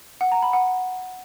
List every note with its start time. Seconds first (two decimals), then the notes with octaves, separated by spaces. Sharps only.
0.21 F#5
0.32 A#5
0.42 B5
0.53 F#5